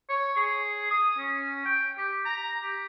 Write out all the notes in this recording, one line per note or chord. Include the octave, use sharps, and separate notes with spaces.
C#5
G#4
D#6
C#4
G5
G4
A#5
G4